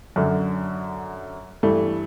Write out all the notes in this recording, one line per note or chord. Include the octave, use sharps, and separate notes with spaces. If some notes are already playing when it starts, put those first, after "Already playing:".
F#2 D3
G2 E3 A3